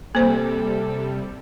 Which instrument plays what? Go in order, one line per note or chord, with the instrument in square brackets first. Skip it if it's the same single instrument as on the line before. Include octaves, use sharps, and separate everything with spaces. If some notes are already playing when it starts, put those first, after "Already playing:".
[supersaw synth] C3 G3 [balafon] A#3 C5 [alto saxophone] A4